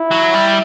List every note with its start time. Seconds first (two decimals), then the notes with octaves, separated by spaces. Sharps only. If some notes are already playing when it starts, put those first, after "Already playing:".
Already playing: E4
0.11 F#3
0.34 G3